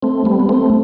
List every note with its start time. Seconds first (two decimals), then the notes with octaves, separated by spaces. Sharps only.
0.03 A3 C4
0.25 G3 B3
0.39 B3
0.49 A3 C4